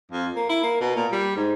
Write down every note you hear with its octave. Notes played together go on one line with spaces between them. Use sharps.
F2
A#3
E4
A#3
B2
A#2
G3
G#2